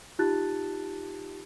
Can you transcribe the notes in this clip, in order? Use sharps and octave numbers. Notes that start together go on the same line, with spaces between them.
D#4 F4 G4 A5 F#6 A6